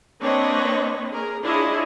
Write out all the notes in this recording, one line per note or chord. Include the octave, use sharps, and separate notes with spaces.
A#3 C4 D4 B4 C#5 D#5
G#4 A#4
D4 E4 F4 G#4 C#5 D#5